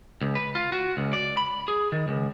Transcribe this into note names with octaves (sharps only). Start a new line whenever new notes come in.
C#2
B4
F4
F#4
C#2
D5
B5
G#4
D#3
C#2